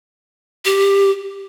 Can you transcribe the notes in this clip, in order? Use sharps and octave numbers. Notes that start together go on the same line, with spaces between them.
G4